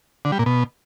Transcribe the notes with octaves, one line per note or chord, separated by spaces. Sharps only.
D3
G3
A#2
B2